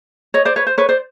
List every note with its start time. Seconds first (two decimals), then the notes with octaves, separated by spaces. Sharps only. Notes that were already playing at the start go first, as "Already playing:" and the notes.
0.34 C#5 D#5
0.45 C5 D5
0.56 B4 C#5
0.67 C5
0.78 B4 C#5
0.89 C5 D5